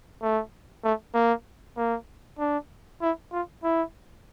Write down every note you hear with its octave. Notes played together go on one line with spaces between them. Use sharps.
A3
A3
A#3
A#3
D4
E4
F4
E4